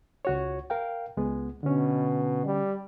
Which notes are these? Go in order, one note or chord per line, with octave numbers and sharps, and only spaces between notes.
C#2 F#4 C#5
A#4 F5 G5
C#2 G#3 B3
B2 D3 C#4
G3